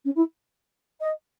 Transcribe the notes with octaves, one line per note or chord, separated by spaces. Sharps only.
C#4
E4
D#5